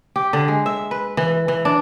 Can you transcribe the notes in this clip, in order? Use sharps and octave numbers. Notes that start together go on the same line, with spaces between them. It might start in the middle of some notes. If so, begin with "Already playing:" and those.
G4
D3
G#3
E5
B4
E3
E3
D4